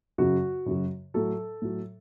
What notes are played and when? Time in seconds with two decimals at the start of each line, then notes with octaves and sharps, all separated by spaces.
0.18 F#2 C#3 F#3 F#4
0.66 F#2 C#3 F#3
1.14 A2 F#3 A4
1.62 A2 F#3